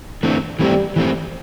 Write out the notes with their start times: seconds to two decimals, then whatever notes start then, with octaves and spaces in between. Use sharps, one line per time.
0.23 D3 E3 A3 C4 D4
0.59 E3 G3 A3 C4 G4
0.96 E3 A3 C4